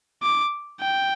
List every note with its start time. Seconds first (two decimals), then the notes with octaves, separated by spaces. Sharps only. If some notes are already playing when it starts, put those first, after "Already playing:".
0.22 D6
0.81 G5